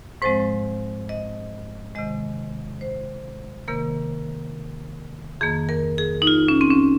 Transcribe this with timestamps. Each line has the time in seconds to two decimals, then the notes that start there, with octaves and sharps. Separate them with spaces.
0.22 G#2 F3 G#3 C4 C5
1.09 D#5
1.95 C3 D#3 G#3 D#5
2.81 C5
3.68 C3 D#3 A#3 A#4
5.41 F2 D#3 A#3 G#4
5.69 A#4
5.98 G#4
6.22 D#4
6.27 F4
6.48 C#4
6.61 C4
6.71 C#4